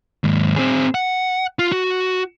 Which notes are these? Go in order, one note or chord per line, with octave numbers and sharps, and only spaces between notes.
D#2 G#2
C4 G#4
F#5
F4
F#4